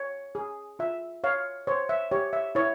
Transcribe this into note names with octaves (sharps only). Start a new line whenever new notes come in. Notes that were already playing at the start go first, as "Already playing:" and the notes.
Already playing: C#5
G#4
F4 E5
C#5 F5
C5 C#5
E5
G4 C#5
E5
E4 C#5